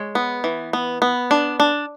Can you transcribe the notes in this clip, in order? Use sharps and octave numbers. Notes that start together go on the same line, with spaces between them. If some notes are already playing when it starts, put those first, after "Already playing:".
Already playing: G#3 C#5
B3
E3
B3
B3
D4
D4